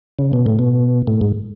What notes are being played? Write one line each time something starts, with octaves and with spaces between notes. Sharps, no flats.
C#3
B2
A2
B2
A2
G#2